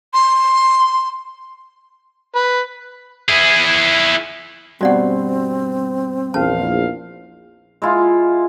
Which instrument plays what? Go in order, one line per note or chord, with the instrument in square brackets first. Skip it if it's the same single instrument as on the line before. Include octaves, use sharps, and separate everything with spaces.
[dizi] C6
[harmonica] B4
[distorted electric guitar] E4 G#4
[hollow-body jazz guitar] G2 B2 [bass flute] C4 [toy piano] F#4 D5 F#5
[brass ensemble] A#1 E2 F5 [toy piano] C#4 A5
[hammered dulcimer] G#3 E4 F4